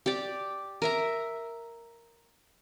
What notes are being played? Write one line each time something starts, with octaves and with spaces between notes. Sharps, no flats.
G4 D5
A#4 E5 A#5